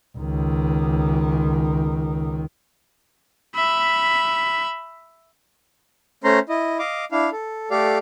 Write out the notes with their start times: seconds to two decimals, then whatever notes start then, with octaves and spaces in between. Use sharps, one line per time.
0.18 C#2 D#3
3.55 E5 B5
6.24 A3 C#4 C5 A#5 C6
6.49 E4 D#5
6.79 D#5 F5 D6
7.12 D4 E4 F5
7.32 A4
7.71 A3 G4 A4 D5 F5